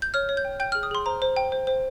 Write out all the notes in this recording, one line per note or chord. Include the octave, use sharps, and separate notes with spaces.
G6
C#5 F6
C#5
G6
G5
G5 G6
G#4 F6
D#6
G#4 C6
C5 A#5
C5
G5
C5
C5